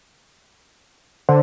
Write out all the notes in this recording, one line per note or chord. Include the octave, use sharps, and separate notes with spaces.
D3 C5